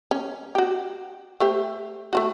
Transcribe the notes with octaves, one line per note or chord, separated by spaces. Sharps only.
C#4
F#4 G4
A3 G4 C5
A3 F4 F#4